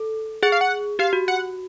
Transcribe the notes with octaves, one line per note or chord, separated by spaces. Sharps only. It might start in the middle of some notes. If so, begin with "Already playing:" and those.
Already playing: A4
G#4 F#5
F5
F#5
G4 F5
F#4
F#5